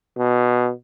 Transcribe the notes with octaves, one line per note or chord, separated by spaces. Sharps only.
B2